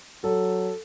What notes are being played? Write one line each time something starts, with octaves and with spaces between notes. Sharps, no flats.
F#3 A4